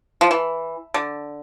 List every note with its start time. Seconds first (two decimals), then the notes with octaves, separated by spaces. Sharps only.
0.21 F3
0.31 E3
0.94 D3